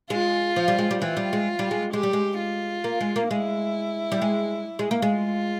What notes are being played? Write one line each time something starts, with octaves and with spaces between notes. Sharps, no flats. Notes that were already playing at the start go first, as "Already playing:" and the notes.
G#3 F4
F3
G3
G#3
G3
E3 F4
G3
G#3
G3
G#3
G#3 G4
G3
G#3
F4
A#3
G#3
A#3
G#3 E4
G3
G#3
G#3
A#3
G#3
F4